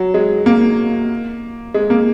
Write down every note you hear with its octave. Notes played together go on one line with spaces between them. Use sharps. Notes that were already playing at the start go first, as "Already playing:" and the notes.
Already playing: F#3
G#3
A#3
G#3
A#3